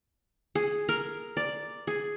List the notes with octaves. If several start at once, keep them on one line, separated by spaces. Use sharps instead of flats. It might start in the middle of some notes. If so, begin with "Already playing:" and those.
G#4
A#4
D5
G#4